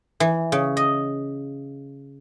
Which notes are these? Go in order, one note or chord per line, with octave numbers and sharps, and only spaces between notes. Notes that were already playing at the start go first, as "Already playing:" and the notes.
E3
C#3
D#5